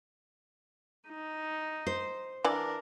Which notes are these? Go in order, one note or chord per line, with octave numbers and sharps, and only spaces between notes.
D#4
C5
E3 D4 A#4 D5